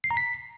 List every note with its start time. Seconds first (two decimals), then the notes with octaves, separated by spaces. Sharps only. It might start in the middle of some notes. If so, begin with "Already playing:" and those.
0.04 C7
0.11 A#5
0.17 B6